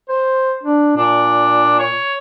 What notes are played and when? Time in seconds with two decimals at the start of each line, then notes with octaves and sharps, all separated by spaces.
0.09 C5
0.63 D4
0.97 A#2 D4
1.79 C#5